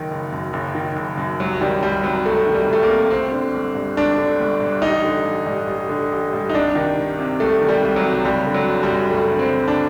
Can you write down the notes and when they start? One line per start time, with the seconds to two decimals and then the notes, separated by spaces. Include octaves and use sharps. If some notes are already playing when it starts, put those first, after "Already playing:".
Already playing: F#1 D#3
0.11 F#1
0.32 F#2
0.53 F#1
0.75 D#3
0.96 F#1
1.17 F#2
1.40 C2 F#3
1.61 D#3 G3
1.83 C2 G3
2.03 C3 F#3
2.26 C2 A3
2.46 D#3
2.54 G3
2.67 C2
2.73 A3
2.83 A#3
2.89 C3
3.10 G1 C4
3.32 D3
3.54 G1
3.75 G2
3.97 G1 D4
4.18 D3
4.40 G1
4.60 G2
4.82 A1 D#4
5.04 D3
5.25 A1
5.46 G2
5.68 A1
5.89 D3
6.12 A1
6.33 G2
6.50 D#4
6.53 C2 D4
6.75 D#3
6.97 C2
7.19 C3
7.40 C2 A3
7.61 D#3
7.68 G3
7.82 C2
7.96 F#3
8.04 C3
8.25 F#1 G3
8.47 D3
8.54 F#3
8.68 F#1
8.83 G3
8.90 F#2
9.11 F#1 A3
9.33 D3
9.39 C4
9.54 F#1
9.68 D4